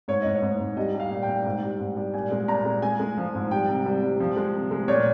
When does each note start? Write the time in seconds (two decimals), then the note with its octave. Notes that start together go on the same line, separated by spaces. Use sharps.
0.08 G#2 C#5
0.22 G#2 D#5
0.35 C#5
0.42 G#2
0.60 G#2
0.77 G3 D#5
0.95 G3
1.00 F5
1.11 A#2
1.23 G5
1.29 A#2
1.45 G#2
1.63 G3
1.80 G#2
1.97 G3
2.14 A#2 G#5
2.31 G#3
2.48 A#2 A#5
2.65 G#3
2.82 G#3 G#5
3.00 G#3
3.17 F3
3.35 G#2
3.51 G3 G5
3.68 C3
3.86 G3
4.03 G3
4.20 F3
4.37 G#3
4.54 C3
4.71 G#3
4.88 A#2 C#5